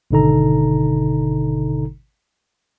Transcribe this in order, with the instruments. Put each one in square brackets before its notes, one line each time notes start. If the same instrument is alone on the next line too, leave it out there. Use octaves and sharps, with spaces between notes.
[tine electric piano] G#1 B2 D3 D#4 A4 A#5